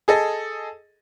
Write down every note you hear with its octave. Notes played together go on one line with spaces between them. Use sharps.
G#4 A4 D#5